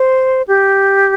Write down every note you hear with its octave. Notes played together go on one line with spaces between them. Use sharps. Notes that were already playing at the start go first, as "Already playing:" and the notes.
Already playing: C5
G4